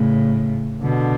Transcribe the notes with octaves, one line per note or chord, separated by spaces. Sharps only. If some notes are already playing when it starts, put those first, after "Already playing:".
Already playing: A2 C#3
B2 D3